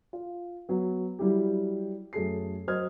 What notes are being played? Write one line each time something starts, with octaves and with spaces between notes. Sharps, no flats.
F4
F#3 B3
F#3 G3 E4 G4
F#2 A3 G#4 A4 C7
F#3 C5 D#5 D#6 F6 G#6